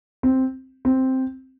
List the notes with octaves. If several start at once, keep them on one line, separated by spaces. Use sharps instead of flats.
C4
C4